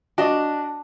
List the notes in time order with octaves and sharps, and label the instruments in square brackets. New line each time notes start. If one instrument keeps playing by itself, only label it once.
[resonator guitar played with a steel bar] D4 [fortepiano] F#4 D5 D#5